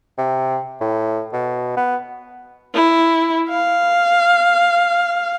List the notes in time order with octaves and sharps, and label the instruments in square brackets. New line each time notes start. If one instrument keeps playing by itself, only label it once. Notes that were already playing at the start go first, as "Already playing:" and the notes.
[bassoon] C3
A2
B2
B3
[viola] E4
F5